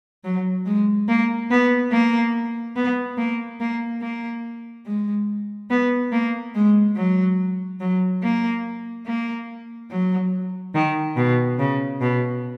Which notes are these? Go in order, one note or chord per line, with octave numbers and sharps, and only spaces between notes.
F#3
G#3
A#3
B3
A#3
B3
A#3
A#3
A#3
G#3
B3
A#3
G#3
F#3
F#3
A#3
A#3
F#3
D#3
B2
C#3
B2